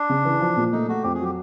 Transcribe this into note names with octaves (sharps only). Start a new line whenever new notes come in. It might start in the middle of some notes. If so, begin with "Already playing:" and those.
Already playing: D4
C#3
E3
F3
A#2
A3 D#4
A3 F#4
F2 G4
G#4
F#3 G4